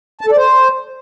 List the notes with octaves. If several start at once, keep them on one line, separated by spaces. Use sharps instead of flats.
A5
A4
D5
C5